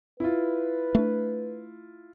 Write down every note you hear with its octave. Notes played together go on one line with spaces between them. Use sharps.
E4 F4 B4
A3 D4